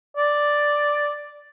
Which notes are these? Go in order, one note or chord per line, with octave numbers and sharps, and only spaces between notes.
D5